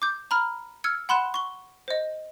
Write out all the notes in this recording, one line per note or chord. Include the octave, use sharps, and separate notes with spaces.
D6 G6
A#5 B5 F6
E6 F6 G#6 C#7
F#5 B5 C6 F#6 E7
C#6 G7
C5 D#5